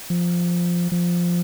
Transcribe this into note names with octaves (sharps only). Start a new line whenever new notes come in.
F3
F3